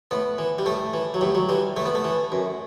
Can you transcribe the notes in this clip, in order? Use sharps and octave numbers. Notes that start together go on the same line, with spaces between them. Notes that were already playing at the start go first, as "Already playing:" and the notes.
A2 B3
E3
G3
A2 A3
E3
F#3
A2 G3
F#3
E3 G3
A2 A3
B3
A3
E3
F#2